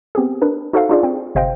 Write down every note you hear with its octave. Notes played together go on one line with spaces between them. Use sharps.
B3 C4 G4 G#4
D4 A#4 B4
D#4 F#4 A4 C5 E5 F5
D4 D#4 F4 G#4 D5
C4 G5
G1 C3 C5 D#5 F5 G5